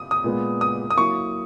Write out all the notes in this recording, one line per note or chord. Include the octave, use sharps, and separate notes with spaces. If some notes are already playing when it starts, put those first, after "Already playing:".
Already playing: D#6
D#6
A#2 G#3 B3
D#6
D#6
F#3 A#3 E4 C#6